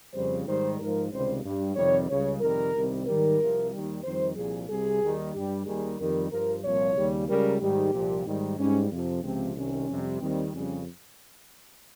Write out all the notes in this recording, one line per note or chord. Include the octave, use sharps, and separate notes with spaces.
F2 C#3 G3 C5
G#2 D#3 G3 C5
G#2 F3 A#4
C#2 C3 D#3 G3 C5
G2 G3
F2 C3 D#3 G3 C#5
C#2 C#3 G3 C#5
F2 C3 D#3 G3 A#4
C2 C3 D#3 G3
G#2 D#3 G3 A#4
C2 C3 F3
D#2 D#3 G3
F2 D#3 G3 C5
C2 A#2 F3 G#4
C2 C3 G3 G#4
D#2 D#3 G3
G2 G3 G4
D#2 D#3 G3 G#4
F2 D#3 G3 A#4
G2 F3 A#4
C2 A#2 F3 C#5
D#2 C#3 G3
C#2 C#3 G3 A#4
G#2 D#3 G3 G4
C2 A#2 F3
G#2 D#3 G3
G#2 G3 C#4
F2 C3 F3
C#2 C3 F3 C4
C2 C3 D#3 C#4
F2 C3 G3
D#2 D#3 G3 C4
F2 C#3 G3 C#4